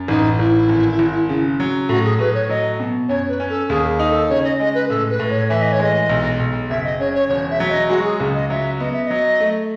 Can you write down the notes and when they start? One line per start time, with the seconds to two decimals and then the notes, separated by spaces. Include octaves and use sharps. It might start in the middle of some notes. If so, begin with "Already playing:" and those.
Already playing: F#2
0.08 A1 D#4
0.39 A1 E4
0.69 G#1
0.99 G#1
1.29 C#3
1.60 F#3
1.89 A2 F#4
2.04 G#4
2.19 A2 B4
2.34 C#5
2.50 F#3 D#5
2.80 B2
3.09 F#2 C#5
3.29 B4
3.40 C#4
3.49 A4
3.69 D#2 G#4
3.99 D#4
4.09 A4
4.30 C#3 C#5
4.44 D#5
4.59 G#3 D#5
4.75 B4
4.89 A2 A4
5.10 B4
5.19 A2
5.30 C#5
5.49 E3 E5
5.62 D#5
5.72 C#5
5.79 G#3 D#5
6.09 B1
6.40 B1
6.70 F#1 E5
6.84 D#5
7.00 C#3 C#5
7.14 C#5
7.30 E1 C#5
7.50 E5
7.60 F#3
7.70 D#5
7.89 G#3 F#4
8.04 G#4
8.20 C#2
8.35 D#5
8.50 F#3 E5
8.80 B3 D#5
8.93 E5
9.04 E5
9.07 F#3 D#5
9.40 A3